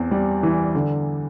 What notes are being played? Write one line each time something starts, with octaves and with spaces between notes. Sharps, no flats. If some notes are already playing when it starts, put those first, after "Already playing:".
Already playing: E2 C4
G3
E3
D3